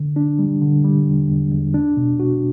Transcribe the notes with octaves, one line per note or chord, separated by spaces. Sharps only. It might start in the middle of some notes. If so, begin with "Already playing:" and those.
Already playing: D3
D4
G3
D3
G3
E2
E2
E2
D4
B2
F#4